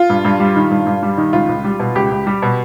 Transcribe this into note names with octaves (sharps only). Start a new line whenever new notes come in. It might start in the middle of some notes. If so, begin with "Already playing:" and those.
Already playing: F4
G2
G2
G3
D#3
G2
G2
G3
D#3
C#2 F4
C#2
G3
B2
C#2 G4
C#2
G3
B2